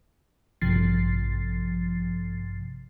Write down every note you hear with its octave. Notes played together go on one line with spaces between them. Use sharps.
A1 G2 C3 F3 A6 C7